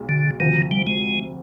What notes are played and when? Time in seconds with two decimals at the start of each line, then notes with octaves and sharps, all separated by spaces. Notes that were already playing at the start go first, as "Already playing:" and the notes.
Already playing: B1 G#3
0.09 D3
0.40 D2 C3 D#3 F3
0.71 G3
0.87 G#3